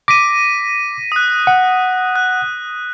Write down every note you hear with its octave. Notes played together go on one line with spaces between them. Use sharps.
D6 A#6 B6 D#7
D#6 F#6
F#5
F#6